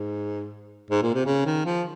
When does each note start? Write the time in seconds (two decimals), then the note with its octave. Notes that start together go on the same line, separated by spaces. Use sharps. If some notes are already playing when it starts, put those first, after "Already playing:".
Already playing: G#2
0.91 G#2
1.02 A#2
1.14 C3
1.26 C#3
1.46 D#3
1.66 F3